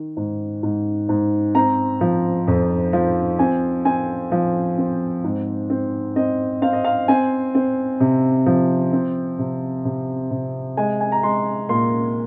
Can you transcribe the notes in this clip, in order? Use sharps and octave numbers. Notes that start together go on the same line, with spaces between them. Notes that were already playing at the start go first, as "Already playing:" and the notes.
Already playing: D#3
G#2
G#2
G#2
C4 A#5
F3
F2
F3
C4 G#5
C4 G#5
F3
C4
G#2
C4
C4 D#5
C4 F5
D#5
F5
C4 G#5
C4
C3
F3
C4
C3
C3
C3
G#3 G#5
G#5
A#5
G#3 C6
A#2 C6